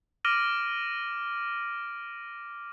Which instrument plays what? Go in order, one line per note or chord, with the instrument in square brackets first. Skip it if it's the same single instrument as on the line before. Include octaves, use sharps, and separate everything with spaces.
[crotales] D6 F6 A#6 D7 D#7 F#7